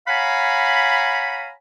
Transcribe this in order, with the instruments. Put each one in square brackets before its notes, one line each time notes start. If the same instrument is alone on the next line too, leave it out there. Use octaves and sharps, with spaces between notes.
[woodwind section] C#5 F5 F#5 G#5 A#5 B5